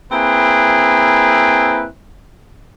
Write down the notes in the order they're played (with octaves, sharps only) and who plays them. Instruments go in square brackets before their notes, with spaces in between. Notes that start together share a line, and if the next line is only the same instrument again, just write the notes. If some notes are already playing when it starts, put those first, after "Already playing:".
[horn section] A#3 C4 E4 G#4 B4